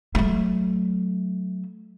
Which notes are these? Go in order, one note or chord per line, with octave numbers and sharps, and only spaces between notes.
F#3 A3